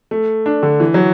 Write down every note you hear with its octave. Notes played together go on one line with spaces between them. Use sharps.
A3
D4
D3
E3
F#3